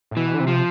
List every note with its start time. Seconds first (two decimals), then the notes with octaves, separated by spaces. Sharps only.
0.11 A2
0.16 B2 E3
0.34 D3
0.40 C3
0.47 F3